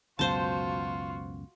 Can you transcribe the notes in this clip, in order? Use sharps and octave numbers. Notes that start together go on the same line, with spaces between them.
C#2 F#2 B2 F4 F#4 C5 A5